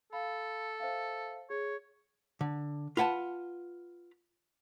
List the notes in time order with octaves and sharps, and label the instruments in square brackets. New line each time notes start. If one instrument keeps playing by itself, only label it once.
[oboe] A4 [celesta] F5 B5
[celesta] C5 E5 F5
[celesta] G#4 [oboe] C#5
[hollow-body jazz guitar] D3
F4 B4 F#5 G#5 A5